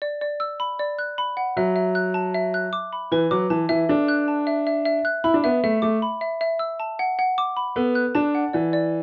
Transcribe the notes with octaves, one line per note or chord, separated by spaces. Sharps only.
D5
D5
E6
B5
D5
F#6
B5
F#5
F#3 E5
E5
F#6
A5
E5
F#6
D6
B5
E3 B4
F#3 D6
E3 A5
E3 E5
D4 A4
F#6
A5
E5
E5
E5
F#6
E4 B5
D4
B3 E5
A3 E5
A3 D6
B5
E5
E5
E6
A5
F#5
F#5
D6
B5
B3 A4
F#6
D4 A5
F#5
E3 D5
D5